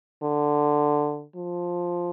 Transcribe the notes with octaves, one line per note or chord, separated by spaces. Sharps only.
D3
F3